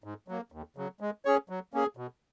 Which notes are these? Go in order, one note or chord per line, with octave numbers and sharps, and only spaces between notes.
G#2
F#3 A#3
D#2
C#3 F#3
G#3
C#4 G#4 C#5
F#3
A#3 C#4 G#4
B2